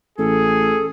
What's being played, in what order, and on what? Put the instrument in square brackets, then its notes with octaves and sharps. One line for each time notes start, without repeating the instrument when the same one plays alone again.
[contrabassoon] A1 [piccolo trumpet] G#4 [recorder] A4